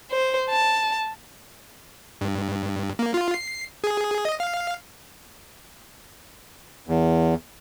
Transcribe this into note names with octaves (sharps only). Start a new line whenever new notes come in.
C5
A5
G2
A#3
F4
C7
G#4
D#5
F5
E2